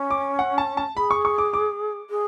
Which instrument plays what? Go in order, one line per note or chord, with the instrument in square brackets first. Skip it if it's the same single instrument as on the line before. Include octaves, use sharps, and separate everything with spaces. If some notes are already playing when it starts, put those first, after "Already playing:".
Already playing: [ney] C#4
[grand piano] D6
F#5
A5
A5
[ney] G#4 [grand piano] B5
[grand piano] C#6
C#6
D6
D6
[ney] G#4